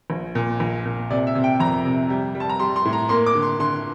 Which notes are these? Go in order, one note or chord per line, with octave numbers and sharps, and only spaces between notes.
A#1
A#2
A#1
A#2
C3 D5
E5
C3
G5
F2 A#5
C3
G3
G3
A5
A#5
G3 C6
C6
A2
A#5
A#3 C6
D6
D3
C6
D3 C6